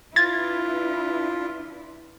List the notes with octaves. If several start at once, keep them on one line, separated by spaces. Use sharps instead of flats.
D4 E4 F4 B4 G#6 A6